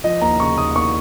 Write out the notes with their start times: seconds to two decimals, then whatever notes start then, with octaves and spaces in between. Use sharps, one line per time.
0.04 F3 D#5
0.21 D#2 A#5
0.40 C#3 C#6
0.58 D#2 D#6
0.76 D#2 C#6